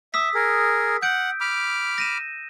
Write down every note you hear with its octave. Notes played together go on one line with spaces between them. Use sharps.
E5 D#6 E6 B6
G#4 A#4
F#5 G6 D7
B5 D6 F6
A#6 D#7 E7